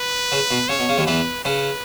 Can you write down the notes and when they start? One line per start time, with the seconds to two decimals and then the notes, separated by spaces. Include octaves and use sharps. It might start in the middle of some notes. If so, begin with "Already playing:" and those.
Already playing: B4
0.32 C#3
0.51 B2
0.69 C#3 C#5
0.79 B2
0.89 C#3
0.98 D#2 D#3
1.07 E2 E3 B4
1.45 C#3 C#4 B4